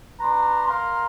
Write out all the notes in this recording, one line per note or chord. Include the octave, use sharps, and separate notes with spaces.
D4 B4 A#5 C6
A#4 F5 A#5 C6